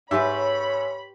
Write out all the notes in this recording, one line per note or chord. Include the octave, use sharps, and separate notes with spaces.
G#2 G4 B4 C#5 E5 B5